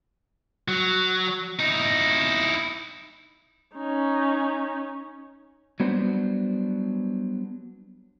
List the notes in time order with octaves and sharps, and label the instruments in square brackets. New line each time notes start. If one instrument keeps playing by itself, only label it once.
[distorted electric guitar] F#3
D#4 E4
[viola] C#4 D#4
[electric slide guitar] F#3 G3 B3 D4 C5